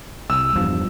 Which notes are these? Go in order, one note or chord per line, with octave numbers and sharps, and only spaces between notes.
C2 E6
E2 G2 F3